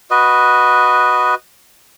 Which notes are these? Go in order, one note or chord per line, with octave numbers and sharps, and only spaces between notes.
F#4 B4 D#5